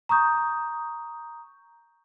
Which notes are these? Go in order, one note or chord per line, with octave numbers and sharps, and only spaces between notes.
A#5 C#6 D#6 G6